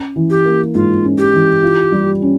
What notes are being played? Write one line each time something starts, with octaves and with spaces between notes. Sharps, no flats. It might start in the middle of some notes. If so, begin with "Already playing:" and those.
Already playing: C#4
E3
G4
A#3
G#2 F4
C#4
G4
E3
F4
G3
C#4